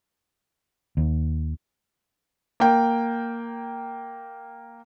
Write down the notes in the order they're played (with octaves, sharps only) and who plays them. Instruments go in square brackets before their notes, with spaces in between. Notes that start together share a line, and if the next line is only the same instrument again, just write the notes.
[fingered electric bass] D#2
[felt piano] A#3 G5